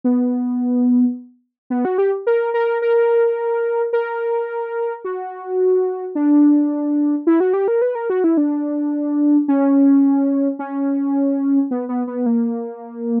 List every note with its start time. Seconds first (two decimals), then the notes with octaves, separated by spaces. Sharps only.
0.04 B3
1.70 B3
1.85 F#4
1.98 G4
2.27 A#4
2.54 A#4
2.82 A#4
3.93 A#4
5.05 F#4
6.15 D4
7.27 E4
7.40 F#4
7.53 G4
7.68 A#4
7.82 B4
7.95 A#4
8.10 F#4
8.24 E4
8.37 D4
9.48 C#4
10.59 C#4
11.71 B3
11.89 B3
12.07 B3
12.26 A#3